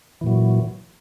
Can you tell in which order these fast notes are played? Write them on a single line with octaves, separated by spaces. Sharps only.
E3 A#2 F#3